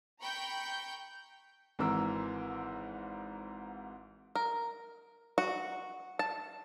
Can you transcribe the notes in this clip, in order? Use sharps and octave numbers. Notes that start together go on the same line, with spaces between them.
G5 A#5 B5 C#6 G6
G#1 G#2 E3 A#4 E6
A#4
F#4
A5